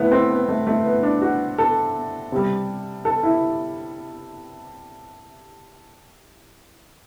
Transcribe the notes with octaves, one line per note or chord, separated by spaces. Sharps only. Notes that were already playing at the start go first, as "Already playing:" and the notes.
Already playing: A2 E3 A3 B3
C4
B3
A3
A3
B3
D4
F#4
A4
C3 G3
A4
E4